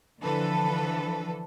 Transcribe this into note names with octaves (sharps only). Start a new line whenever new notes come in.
D3 E3 F3 A4 B4